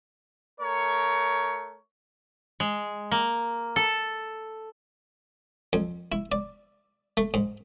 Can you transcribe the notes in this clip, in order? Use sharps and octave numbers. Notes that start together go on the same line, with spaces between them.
A3 A#4 C#5 C#6
G#3
A#3
A4
F2
E4
D5
A3
G#2